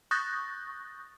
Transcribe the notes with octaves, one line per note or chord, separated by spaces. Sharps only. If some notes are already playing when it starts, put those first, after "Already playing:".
C#6 D#6 F#6 G6 A6 A#6